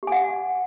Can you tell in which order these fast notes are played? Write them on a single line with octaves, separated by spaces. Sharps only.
G4 G#5 F#5